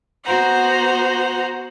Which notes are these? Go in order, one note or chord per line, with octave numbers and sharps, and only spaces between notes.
B3 F#4 C5 F#5 A#5